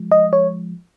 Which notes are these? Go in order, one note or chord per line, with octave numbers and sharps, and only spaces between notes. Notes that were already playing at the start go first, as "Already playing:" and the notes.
Already playing: F3 G#3
D#5
C#5